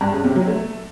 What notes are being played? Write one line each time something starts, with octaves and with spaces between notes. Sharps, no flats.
G2
C#3
C3
F#3
A3